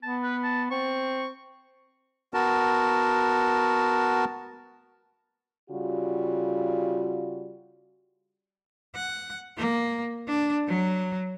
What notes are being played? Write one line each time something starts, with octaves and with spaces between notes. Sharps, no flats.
B3 A5
B4
A5
C4 C#6
B3 F#4 A#4 A5
C#3 G3 F4 F#4
F#5
A#3
D4
F#3